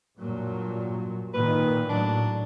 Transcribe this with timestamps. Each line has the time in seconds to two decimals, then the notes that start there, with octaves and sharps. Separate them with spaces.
0.19 G2 A#2 F#3
1.34 A#2 D#3 B4
1.89 A2 F#3 D4